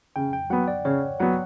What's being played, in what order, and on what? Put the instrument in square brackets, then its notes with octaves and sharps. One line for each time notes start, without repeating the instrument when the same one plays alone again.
[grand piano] C#3 [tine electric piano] G5
[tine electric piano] G5
[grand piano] F#3 B3 [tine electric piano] F#5
[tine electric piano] D5
[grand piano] C#3 [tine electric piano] C#5
[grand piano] F#3 B3 [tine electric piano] F#5